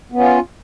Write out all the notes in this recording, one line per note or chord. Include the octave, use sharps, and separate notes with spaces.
B3 C#4 F4